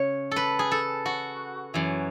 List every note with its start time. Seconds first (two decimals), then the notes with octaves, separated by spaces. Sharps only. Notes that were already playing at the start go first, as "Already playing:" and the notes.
Already playing: C#3 C#5
0.31 A4 B4
0.59 G#4
0.71 A4
1.06 F#4
1.74 F#2 E3